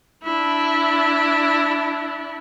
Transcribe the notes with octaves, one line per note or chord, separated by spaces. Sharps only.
D4 E4